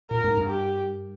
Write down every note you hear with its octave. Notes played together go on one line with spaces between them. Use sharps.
A#2 A#4
G#2
G2
G4